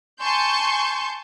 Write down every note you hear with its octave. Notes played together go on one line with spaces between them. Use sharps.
G#5 A5 C6 C#6 G6